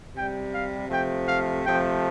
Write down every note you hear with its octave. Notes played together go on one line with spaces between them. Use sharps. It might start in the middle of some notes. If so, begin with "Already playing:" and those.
C3 G3 G5
F5
C3 F3 A3 G5
F5
C3 F3 A3 G5